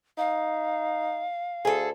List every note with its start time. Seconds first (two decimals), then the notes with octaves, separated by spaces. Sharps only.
0.18 D#4 F5
1.65 D2 G#4 A4